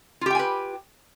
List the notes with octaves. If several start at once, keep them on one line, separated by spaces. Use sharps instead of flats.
F4 G4 B4 G5 G#5